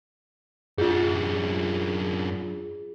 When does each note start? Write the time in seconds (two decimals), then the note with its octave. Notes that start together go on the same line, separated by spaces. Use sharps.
0.78 F#2 D4 F4 G#4